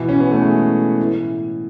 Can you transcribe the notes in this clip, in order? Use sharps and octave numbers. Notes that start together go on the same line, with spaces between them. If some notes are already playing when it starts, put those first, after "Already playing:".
Already playing: B2 E3
C#4
B3
A3
G#3
A2 E3